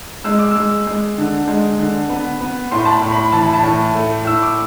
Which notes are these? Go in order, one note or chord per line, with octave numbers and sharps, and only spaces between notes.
G#3 E6
D6
G#3 E6
G#3
D3
G#3
D3
B3
B3
A2 C6
A5
B5
A2
B5
E3 A5
B5
A5
A2
A3
A2 E6
D6